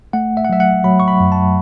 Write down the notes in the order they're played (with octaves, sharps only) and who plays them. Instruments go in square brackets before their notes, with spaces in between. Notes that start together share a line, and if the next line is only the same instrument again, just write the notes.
[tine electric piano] A3 F#5
E5
F#5
F#3 E5
F#5
F#3 B5
C#6
B5
F#2
A5